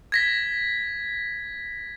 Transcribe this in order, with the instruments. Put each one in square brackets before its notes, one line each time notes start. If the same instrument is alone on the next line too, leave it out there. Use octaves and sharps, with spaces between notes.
[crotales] G#6 A#6 B6